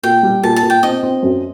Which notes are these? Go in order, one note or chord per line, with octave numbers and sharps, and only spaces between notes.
A#2 G5
G3
A#2 A5
A5
A#2
G5
C4 D#5
C4
F#2